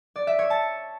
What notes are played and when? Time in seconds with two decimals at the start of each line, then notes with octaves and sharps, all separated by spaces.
0.16 D5
0.27 E5
0.39 C#5
0.50 A5